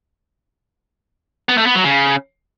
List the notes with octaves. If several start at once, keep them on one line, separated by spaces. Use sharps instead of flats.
B3
A3
B3
F#3
C#3